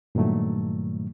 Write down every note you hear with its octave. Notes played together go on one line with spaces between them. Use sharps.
G2 A#2 D#3 F#3 A3